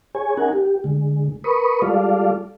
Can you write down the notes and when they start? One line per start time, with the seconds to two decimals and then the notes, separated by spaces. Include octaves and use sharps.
0.15 G#4 C#5 G#5
0.37 C#4 D#4 A#4 F#5 G#5
0.53 G4
0.84 D3 G#3
1.44 A#4 B4 B5 C#6 D#6
1.82 G3 G#3 F4 A4 D5 F5